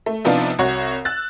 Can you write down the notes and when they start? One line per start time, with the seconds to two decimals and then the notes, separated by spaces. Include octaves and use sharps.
0.06 A3
0.24 C3 F3 B3 D4 D#4 F4
0.59 C2 F#4 C#5
1.05 E6 F#6 A6